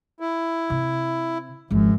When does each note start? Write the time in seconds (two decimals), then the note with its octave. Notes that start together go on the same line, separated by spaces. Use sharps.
0.20 E4
0.70 C3
1.71 G#1 F#2 F3